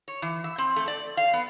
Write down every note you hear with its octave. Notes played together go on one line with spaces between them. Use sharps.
C#5
E3
E5
C4
A3
D5
F5
B3